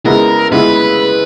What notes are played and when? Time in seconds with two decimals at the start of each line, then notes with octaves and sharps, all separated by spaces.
0.06 C#3 G#3 B3 E4 A#4
0.51 C#3 G#3 B3 E4 B4